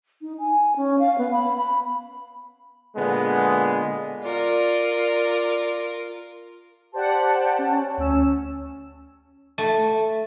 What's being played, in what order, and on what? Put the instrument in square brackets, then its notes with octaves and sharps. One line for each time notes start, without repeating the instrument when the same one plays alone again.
[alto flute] D#4
G#5
C#4
F5
B3
B5
B5
[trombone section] A#2 D3 G#3 B3
[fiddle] F4 A#4 [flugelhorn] D5
[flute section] G4 A5 [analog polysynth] C5 D5 F#5
[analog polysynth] C#4
D2 C#4 E6
[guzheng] A3